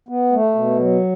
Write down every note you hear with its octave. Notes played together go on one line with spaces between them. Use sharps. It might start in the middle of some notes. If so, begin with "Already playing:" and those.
B3
A3
B2
F#3